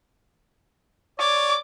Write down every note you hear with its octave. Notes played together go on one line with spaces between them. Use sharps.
C#5 D5 D6